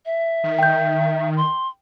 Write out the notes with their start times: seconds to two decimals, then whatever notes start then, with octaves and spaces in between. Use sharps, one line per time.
0.06 E5
0.44 D#3
0.59 G5 G6
1.37 C6